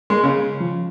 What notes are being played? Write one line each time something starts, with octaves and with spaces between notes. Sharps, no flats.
G#3
C#3
F3